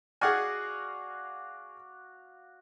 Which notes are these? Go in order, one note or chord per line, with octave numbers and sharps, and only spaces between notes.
F#4 G#4 D5 F5 F#5 G#5